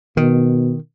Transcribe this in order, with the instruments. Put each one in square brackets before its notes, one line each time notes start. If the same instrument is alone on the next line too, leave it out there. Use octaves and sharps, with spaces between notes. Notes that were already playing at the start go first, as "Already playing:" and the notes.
[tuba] B2 [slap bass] D#3